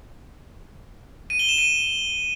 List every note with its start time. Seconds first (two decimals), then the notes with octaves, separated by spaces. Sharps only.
1.30 D#7
1.39 G7
1.49 E7
1.58 D#7